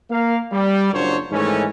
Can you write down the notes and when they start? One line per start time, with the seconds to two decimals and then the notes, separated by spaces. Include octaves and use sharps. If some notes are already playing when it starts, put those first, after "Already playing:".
0.10 A#3 F5
0.52 G3
0.93 F#1 A#2 F#3 D4 C5 C#5
1.31 G#2 D#3 E3 A3 C#4